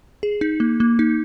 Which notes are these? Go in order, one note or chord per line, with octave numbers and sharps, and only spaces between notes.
G#4
D#4
A#3
A#3
D#4